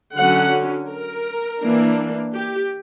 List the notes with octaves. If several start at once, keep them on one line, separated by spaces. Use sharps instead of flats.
D3 F#3 C#4 F#5
A#4
E3 A#3 D4
G4